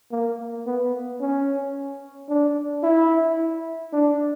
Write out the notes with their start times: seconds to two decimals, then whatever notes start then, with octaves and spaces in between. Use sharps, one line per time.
0.12 A#3
0.66 B3
1.21 C#4
2.29 D4
2.83 E4
3.93 D4